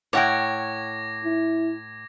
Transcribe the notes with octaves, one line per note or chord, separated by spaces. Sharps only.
A2 C#5 F#5 G5 D6 G#6 A#6
E4